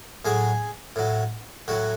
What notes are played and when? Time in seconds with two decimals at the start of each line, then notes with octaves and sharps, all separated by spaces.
0.25 A2 F#3 G#4
0.96 A2 F#3
1.68 A2 F#3 F#4